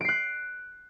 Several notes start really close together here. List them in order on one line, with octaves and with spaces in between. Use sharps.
D7 C7 F#6